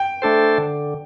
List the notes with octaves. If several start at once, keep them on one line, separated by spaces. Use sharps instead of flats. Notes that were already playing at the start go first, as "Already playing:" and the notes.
Already playing: G5
A3 D4 A4 C5
D3